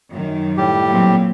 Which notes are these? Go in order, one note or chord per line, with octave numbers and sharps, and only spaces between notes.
F#2 D#3
A2 G3 G4
A#2 F#3 C4